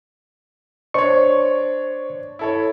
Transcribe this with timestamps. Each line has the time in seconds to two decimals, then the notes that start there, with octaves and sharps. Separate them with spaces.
0.94 D4 C5 C#5 C#6
2.39 E4 A4 C#5